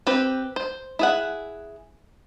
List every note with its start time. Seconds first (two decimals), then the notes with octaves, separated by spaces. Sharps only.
0.07 C4 G4 B4
0.56 C5
0.99 E4 G#4 F#5